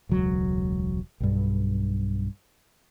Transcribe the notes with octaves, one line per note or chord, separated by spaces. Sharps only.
E1 C#2 F#3
B1 G2